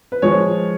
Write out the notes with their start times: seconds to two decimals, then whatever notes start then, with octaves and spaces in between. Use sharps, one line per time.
0.12 B4
0.22 F3 G#3 C#5